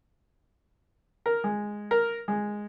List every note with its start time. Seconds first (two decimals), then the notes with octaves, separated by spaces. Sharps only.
1.26 A#4
1.44 G#3
1.91 A#4
2.28 G#3